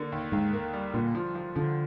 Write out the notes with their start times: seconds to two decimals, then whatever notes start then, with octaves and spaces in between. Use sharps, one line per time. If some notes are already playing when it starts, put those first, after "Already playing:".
Already playing: D3 A#3
0.12 D#2
0.32 D#2 G#2
0.53 A#3
0.74 G3
0.94 A#2 D3
1.15 F3
1.35 F3
1.55 D3 F3